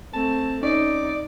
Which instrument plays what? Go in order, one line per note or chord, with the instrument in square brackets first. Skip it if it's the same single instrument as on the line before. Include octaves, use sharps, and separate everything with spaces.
[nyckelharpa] A3 C4 [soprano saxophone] A5
[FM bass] C#4 [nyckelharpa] D#4 [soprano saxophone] D5